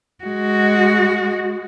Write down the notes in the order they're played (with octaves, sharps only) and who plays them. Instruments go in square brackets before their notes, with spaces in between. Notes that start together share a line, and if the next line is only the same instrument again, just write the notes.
[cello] G#3 F#4